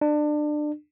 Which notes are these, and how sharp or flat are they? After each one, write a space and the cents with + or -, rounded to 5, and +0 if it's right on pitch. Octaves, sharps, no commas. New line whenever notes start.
D4 +25